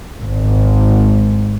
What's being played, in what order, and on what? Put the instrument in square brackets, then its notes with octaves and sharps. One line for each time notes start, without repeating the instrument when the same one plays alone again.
[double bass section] G#1